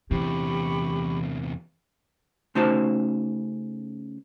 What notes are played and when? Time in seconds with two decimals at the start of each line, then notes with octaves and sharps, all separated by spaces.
0.11 E2 C3 E3 G4 B5 C#6
2.55 C#3 A3 D#4 F#4 C5 A5